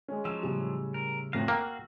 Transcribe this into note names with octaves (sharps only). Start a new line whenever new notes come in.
G#3 C#4
F3 F#3 E6
A2 C#3 G3
A#4
A1 F2 F#4 F5 A#6
A#3 G5 E6